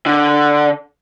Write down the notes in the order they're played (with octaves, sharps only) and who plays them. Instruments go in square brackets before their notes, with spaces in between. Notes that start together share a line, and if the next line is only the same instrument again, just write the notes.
[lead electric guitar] D3